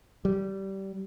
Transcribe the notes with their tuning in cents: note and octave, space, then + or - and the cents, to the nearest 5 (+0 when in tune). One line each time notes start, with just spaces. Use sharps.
G3 -20